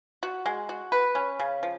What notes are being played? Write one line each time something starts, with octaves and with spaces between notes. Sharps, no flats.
F#4
G#3
F#4
B4
C#4
C#3
F3